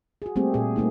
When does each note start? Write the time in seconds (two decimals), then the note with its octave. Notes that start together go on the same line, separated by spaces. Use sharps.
0.22 F#4 G#4
0.36 G3 A3 A#3 C4 G4 G#4
0.54 A#2 G#4
0.76 G3 A3 A#3 D#4